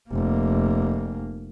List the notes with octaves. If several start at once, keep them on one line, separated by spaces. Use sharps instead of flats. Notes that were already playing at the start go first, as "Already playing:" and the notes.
F1 A#3